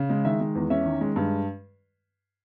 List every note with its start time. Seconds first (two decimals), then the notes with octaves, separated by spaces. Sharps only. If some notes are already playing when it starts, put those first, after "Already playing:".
Already playing: C#3
0.10 G#3
0.25 D#3 E5
0.40 G#3
0.55 E2
0.70 C#4 E5
0.86 D#3
1.01 G#3
1.16 G2